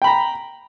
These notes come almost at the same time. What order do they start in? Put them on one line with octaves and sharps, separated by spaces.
G5 B5 A#5